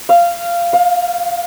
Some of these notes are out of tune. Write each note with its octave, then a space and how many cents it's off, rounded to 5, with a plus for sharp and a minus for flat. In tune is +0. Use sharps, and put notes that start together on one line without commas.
F5 -15
F5 +25